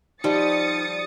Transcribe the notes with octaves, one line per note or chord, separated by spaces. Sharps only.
F3 G3 D#4 D#6 A6 C#7